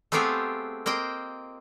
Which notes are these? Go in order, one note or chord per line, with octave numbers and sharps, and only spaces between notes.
A3 B3 C4 F4 G4 G#4
A#3 C4 D#5 G5